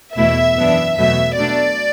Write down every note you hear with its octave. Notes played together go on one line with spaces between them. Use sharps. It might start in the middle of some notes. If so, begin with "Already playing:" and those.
E2 B2 A3 E4 E5
F#2 E3 B3 D4
E2 B2 F#3 A3 E5
B2 A3 D4 D5